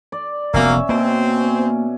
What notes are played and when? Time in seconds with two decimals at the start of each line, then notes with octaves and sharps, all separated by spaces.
0.12 D5
0.54 F1 F#3 A#3 B3 C#4 E5
0.89 B2 A#3 C4